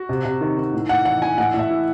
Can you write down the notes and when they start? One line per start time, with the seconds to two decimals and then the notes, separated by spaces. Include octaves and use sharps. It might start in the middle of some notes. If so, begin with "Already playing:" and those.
Already playing: F#4
0.09 C3
0.25 C3
0.41 D#3
0.58 D#3
0.73 A2
0.89 A2 F#5
1.05 E3 F#5
1.22 E3 G#5
1.38 A2 F#5
1.54 A2
1.59 E5
1.70 E3